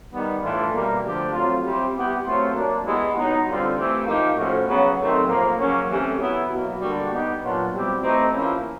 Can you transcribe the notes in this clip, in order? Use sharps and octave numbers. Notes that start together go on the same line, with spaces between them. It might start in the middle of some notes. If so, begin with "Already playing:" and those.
D#3 G3 B3
A2 E3 A3 D4 F4
B2 G3 A#3
D3 F3 A3 D4 G4
F#3 A3 C4 F4
G3 C4 E4 G4
G3 B3 E4 G4
F#3 A3 C4 F4
F#3 A#3 D4
E3 G#3 B3 E4 G4
F#3 B3 D#4
D3 G3 C4 F4
E3 A3 C4 E4 G4
F3 A#3 D#4 G4
A2 F3 A3 C#4 F#4
C#3 F#3 B3
C3 D#3 F#3 A3 C4
A2 F3 A#3
C#3 F#3 A#3 C#4
C3 E3 A3 C#4
F#3 B3 E4
B2 F#3 A#3
D3 G3 A#3 D4 F#4
G3 B3 D#4 G4
A#2 F#3 B3 D4 F4
B2 G3 C4 E4 G4
E3 A3 C4 D#4 G4
F3 A#3 C#4 E4